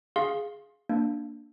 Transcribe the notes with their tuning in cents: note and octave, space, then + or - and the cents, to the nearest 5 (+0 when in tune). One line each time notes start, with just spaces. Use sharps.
G#4 +0 F5 +0 C6 +30
A#3 +0 D4 +0